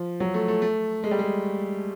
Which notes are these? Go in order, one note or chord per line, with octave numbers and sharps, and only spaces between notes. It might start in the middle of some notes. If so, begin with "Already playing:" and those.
Already playing: F3
F#3
A3
A3
A3
G#3
G3
G#3